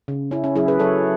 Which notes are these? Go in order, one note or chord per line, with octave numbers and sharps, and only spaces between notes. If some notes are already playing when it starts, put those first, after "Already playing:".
C#3
C#4 E4
C#4
F#3 E4 G#4
G#4 B4
F#3 A4 C#5